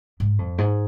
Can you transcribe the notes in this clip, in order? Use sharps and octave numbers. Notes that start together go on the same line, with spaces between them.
G#2
F2
G#2